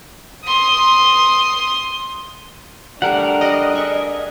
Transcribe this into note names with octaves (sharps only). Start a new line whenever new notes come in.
C6 D#6
G3 A3 D4 A#4 F#5
G3 D#5
G#4 E5 C#6